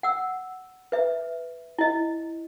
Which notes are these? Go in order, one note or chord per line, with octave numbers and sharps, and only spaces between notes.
F#5 E6
B4 E5
E4 D#5